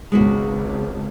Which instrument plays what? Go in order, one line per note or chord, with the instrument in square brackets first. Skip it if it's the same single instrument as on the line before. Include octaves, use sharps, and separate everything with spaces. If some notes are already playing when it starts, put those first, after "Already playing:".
[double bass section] G#1 C#2 [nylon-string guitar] G#3 B3 F#4